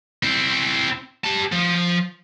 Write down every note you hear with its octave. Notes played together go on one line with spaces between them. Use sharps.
C4 E4
G4 A5
F3